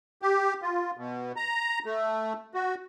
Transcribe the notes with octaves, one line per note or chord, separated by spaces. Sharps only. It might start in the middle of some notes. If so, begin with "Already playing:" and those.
G4
F4
B2
A#5
A3
F#4